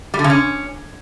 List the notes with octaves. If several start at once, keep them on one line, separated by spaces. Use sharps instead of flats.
G3
D3
C#3
C#4